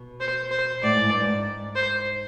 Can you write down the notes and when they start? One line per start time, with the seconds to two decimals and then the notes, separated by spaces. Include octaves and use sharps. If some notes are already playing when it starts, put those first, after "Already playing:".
Already playing: B2
0.20 C5
0.51 C5
0.82 A2 D5
0.96 G#2
1.09 G2
1.21 G#2
1.76 C5